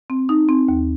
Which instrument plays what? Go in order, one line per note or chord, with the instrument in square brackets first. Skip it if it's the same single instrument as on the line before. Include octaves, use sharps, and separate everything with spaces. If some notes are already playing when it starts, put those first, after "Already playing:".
[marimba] C4
D#4
C4
D#2